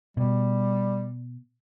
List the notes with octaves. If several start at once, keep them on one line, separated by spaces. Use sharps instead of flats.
B2 G3